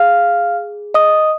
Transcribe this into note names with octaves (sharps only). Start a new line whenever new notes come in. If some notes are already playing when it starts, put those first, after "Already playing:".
Already playing: G#4 F5 F6
D#5 D#6